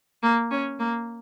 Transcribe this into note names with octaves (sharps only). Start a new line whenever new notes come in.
A#3
C#4
A#3